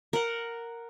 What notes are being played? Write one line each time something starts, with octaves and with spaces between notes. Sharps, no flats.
A#4 F#5